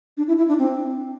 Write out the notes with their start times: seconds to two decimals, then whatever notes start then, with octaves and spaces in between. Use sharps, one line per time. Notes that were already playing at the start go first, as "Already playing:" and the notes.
0.17 D4
0.28 E4
0.38 E4
0.48 D4
0.59 C4